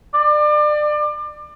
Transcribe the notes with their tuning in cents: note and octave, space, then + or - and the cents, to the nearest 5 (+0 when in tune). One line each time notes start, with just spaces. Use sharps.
D5 +30